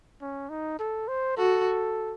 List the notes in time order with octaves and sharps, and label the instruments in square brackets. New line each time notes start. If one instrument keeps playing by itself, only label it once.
[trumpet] C#4
D#4
A4
C5
[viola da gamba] F#4 [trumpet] A4